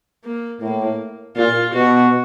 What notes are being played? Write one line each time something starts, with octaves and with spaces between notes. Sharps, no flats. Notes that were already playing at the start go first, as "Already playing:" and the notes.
A#3
A2 A#3
A#2 F4
B2 F#4